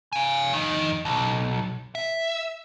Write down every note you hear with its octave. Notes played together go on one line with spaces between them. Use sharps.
F5 G#5
F2 D#3
B1
E5